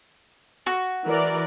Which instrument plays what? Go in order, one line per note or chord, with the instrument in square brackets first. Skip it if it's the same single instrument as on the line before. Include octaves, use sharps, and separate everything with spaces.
[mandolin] F#4
[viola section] E3 A#4 D5